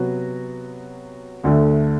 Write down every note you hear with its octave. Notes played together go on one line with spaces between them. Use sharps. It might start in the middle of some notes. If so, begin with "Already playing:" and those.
Already playing: C3 F#3 B3 F#4
D2 D3 A3